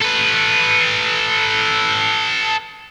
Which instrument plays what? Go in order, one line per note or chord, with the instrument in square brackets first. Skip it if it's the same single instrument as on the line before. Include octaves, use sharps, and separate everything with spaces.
[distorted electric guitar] A4 B4